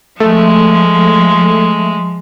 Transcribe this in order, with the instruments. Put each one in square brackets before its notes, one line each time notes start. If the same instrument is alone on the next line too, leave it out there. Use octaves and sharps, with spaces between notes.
[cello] F3 [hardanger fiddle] G#3 [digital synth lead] A3